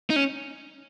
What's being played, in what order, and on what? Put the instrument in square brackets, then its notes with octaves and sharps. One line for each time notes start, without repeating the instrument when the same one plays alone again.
[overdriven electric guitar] D#4
C#4